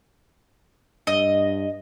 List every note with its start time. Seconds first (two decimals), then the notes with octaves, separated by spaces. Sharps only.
1.07 G2 D#5